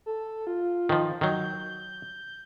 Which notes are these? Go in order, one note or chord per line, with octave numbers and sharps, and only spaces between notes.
A4
F4
D#3 F3
D#3 F#3 G6